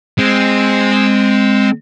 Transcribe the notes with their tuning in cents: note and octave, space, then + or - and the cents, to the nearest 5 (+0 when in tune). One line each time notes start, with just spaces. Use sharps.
G#3 -10 C4 +0